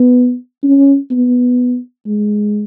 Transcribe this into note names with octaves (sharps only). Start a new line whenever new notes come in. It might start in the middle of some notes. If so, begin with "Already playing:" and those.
Already playing: B3
C#4
B3
G#3